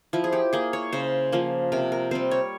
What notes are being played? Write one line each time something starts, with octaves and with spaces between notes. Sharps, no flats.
F3 E4
G#4
G4
A#3 G#4
C#5
C#3 C5
F3 A#3
C3 A#4
A#4
G3 C4 C5
C#5